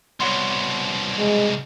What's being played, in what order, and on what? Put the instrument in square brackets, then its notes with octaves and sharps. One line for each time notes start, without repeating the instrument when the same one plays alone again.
[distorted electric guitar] C2 B2 [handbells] C#5 F#5 C6
[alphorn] G#3